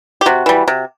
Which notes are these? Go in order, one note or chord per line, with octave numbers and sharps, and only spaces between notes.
G4
C3 F#4
E3 G3
C3